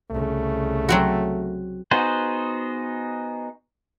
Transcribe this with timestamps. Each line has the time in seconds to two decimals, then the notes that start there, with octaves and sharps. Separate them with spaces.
0.11 C2 C#3 A3
0.89 F#3 C4 F#4
1.91 B3 D#4 F#4 G#4 C5